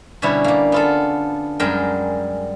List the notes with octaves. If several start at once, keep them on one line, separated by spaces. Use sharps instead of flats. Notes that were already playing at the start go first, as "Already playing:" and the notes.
B2 D3 G3 C#4 E4
G3 A#3
B3 F4 A4
F#2 G3 G#3 A#4 G5